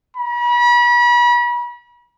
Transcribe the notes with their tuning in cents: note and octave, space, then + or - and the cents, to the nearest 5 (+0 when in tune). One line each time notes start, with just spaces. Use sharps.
B5 -40